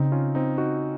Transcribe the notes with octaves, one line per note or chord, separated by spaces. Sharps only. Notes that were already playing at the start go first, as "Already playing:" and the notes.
Already playing: C#3 C4 D#4
C#4 F4
C4 D#4
D#4 F#4